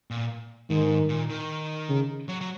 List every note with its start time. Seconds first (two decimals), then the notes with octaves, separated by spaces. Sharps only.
0.10 A#2
0.70 G#2 D#3
1.10 A#2
1.30 D#3
1.89 C#3
2.28 F#3
2.41 F#3